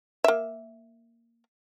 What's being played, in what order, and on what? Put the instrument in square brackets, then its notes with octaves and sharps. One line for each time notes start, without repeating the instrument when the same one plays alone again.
[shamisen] A#3 E5